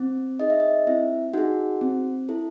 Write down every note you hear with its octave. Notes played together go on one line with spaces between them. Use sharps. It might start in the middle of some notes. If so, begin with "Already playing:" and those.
Already playing: C4
D#4 G#4 D#5
E5
D#5
C4 E4 E5
D#4 F#4 G#4 F#5
C4
E4 A4